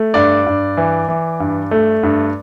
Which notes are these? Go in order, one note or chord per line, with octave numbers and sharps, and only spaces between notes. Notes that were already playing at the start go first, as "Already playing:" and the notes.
Already playing: A3
G2 D5
G2
E3
E3
G2
A3
G2